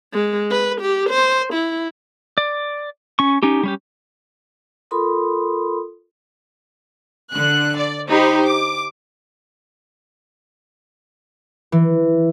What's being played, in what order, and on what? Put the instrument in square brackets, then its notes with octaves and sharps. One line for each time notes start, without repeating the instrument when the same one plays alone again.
[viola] G#3
B4
G4
C5
E4
[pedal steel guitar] D5
C#4 C#6
C#4 D#4 G4
G3 C#4 G4
[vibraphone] F4 A4 A#4 B5 C6 D#6
[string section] D3 F#6
D5
D#4 G4 C5 B5
D6
[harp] E3